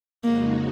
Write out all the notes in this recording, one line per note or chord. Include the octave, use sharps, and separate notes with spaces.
F2 C#3 G#3 A#3 D#4 F#4